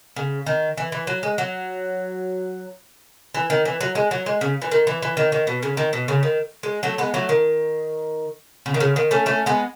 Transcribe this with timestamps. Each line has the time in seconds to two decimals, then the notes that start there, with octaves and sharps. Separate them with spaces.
0.16 C#3
0.46 D#3
0.77 E3
0.92 E3
1.07 F#3
1.23 G#3
1.38 F#3
3.34 E3
3.50 D#3
3.65 E3
3.81 F#3
3.95 G#3
4.11 F#3
4.26 G#3
4.41 C#3
4.62 E3
4.71 D#3
4.87 E3
5.02 E3
5.17 D#3
5.32 D#3
5.47 B2
5.63 C#3
5.77 D#3
5.93 B2
6.08 C#3
6.23 D#3
6.63 G#3
6.83 F#3 A3
6.98 G#3 B3
7.14 F#3 A3
7.29 D#3
8.66 C#3
8.74 D#3
8.80 C#3
8.96 D#3
9.11 A3 C#4
9.26 A3 C#4
9.46 G#3 B3